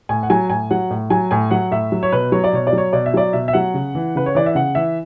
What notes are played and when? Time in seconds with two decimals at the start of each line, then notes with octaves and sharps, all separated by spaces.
0.09 A2 G#5
0.23 F#5
0.30 F#3 G#5
0.50 A2 G#5
0.71 F#3 F#5
0.90 A2
1.10 F#3 G#5
1.31 A2 G#5
1.51 F#3 F#5
1.71 A2 E5
1.92 F#3
2.03 C#5
2.12 B2 B4
2.32 F#3 C#5
2.44 D5
2.53 B2 C#5
2.67 D5
2.73 F#3
2.78 C#5
2.93 B2 D5
3.06 E5
3.14 F#3 D5
3.33 B2 E5
3.48 E5
3.53 F#3 F#5
3.74 C#3
3.95 E3
4.15 C#3 B4
4.26 C#5
4.35 E3 D5
4.46 E5
4.55 C#3 F#5
4.75 E3 E5